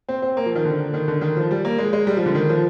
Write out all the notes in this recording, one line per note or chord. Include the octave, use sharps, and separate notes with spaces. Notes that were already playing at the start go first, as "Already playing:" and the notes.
C4
C4
A#3
F3
D#3
D3
D#3
D3
D#3
F3
G3
A#3
G#3
G#3
G3
F3
D3
D#3
F3